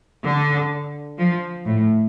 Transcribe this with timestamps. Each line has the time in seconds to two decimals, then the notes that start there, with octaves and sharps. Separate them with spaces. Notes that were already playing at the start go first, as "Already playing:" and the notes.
0.24 D3
1.18 F3
1.65 A2